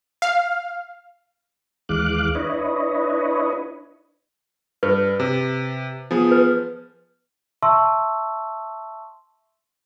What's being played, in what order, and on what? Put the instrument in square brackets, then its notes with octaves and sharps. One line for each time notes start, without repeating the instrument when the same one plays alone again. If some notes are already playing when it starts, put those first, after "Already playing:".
[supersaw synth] F5
[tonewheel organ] D#2 E3 G#3 F5 D6 F#6
D4 E4 B4 C#5 D#5
[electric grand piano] G2 [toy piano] B4
[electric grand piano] C3
F3 B3 G#4
[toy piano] B4
[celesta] E5 A5 C6 C#6 E6